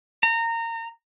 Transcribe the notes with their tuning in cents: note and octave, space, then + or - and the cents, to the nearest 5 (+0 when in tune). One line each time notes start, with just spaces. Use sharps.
A#5 -25